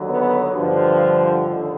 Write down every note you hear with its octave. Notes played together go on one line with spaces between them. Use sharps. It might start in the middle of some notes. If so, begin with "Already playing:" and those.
Already playing: D#2 D3 F#3
B3
G2 D3 F3
D#2 D3